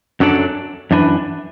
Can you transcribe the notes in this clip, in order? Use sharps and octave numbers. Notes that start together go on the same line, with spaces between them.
F#2 F#3 D4 A4 D5
F#2 E3 D4 B4